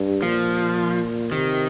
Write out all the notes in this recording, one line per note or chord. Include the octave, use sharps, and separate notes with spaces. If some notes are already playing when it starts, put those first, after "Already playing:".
Already playing: G2
A#2 F3
C3 D#3